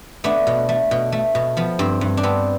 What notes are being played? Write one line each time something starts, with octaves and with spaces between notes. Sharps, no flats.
A3 B3 D4
B2
A3
B2
A3
B2
F3 B3
G2 C4
G2
D4
B3 C4